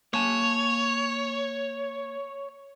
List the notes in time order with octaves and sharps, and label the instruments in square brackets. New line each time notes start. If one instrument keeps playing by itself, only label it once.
[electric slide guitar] A#3 G#5 A5 [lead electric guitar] C#5